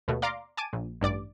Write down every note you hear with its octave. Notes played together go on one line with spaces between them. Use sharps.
D#2 B2 A3
D5 F5 A#5 C6 D6
G#5 A5 D6 D#7
A#1
A1 G2 D5 D6